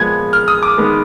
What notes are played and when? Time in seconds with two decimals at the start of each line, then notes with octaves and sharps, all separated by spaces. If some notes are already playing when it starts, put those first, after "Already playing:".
Already playing: A#2 F3 G#3 B3 G#6
0.33 F6
0.48 D#6
0.63 D6
0.77 D#3 G#3 B3